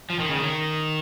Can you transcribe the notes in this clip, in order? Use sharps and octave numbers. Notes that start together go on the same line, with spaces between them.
F3
D#3
C#3
D#3